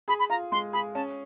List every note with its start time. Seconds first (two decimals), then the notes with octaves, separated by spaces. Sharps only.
0.08 G#4 B5
0.19 B5
0.30 F4 A#5
0.52 G#3 C6
0.73 G#4 B5
0.95 C#4 A5